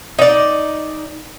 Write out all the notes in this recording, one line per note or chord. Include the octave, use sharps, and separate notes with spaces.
D#4 D5